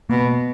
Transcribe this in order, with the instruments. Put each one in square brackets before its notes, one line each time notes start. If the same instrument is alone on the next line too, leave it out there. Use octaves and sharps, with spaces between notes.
[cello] B2 [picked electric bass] A#3